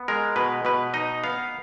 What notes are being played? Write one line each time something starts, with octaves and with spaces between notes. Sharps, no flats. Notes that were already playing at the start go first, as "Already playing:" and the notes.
Already playing: B3
G#3 A#4
B2 B4
B2 B4
D#4 D#5
B3 F5